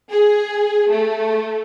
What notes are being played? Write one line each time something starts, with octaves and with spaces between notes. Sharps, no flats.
G#4
A3